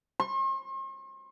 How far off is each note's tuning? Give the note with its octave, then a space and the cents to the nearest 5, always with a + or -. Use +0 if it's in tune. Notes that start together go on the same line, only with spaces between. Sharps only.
C6 +45